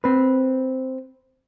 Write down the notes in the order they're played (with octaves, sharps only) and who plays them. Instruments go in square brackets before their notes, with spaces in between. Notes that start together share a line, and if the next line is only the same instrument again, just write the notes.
[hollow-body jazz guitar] C4 B4